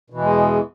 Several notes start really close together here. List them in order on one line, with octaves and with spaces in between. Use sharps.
B2 E3 E2 G#3